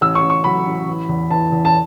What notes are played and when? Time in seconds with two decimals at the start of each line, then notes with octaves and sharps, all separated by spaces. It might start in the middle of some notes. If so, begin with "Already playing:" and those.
0.01 A1 E6
0.15 C#6
0.23 A1
0.30 C#6
0.44 F#3 B5
0.66 A1
0.88 E3
1.09 E2
1.30 E3 A5
1.52 E2
1.65 A5